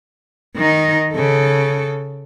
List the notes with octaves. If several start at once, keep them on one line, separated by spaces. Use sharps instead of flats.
D#3 D#4
C#3 A4